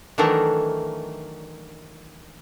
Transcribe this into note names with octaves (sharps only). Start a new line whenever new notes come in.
D#3 E3 F#3 A3 D4 A#4